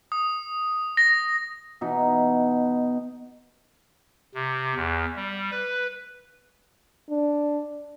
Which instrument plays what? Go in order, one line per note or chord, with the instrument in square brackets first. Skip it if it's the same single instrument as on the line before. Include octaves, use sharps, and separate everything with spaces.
[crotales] D#6
A#6
[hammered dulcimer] B2 E3 B3 D#4
[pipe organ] C3
E2
G3
B4
[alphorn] D4